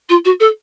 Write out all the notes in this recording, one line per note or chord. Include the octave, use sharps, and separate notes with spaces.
F4
F#4
A4